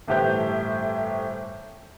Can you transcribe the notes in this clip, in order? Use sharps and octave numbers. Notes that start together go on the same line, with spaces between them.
G1 A2 E3 G4 C5 G6